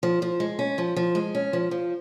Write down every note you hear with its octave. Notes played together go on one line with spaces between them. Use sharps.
F3
F3
G#3
C#4
F3
F3
G#3
C#4
F3
F3